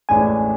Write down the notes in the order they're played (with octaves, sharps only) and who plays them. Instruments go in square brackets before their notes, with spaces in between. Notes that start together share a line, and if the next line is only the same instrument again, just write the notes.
[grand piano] A1 A2 G#3 D4 [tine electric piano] G#5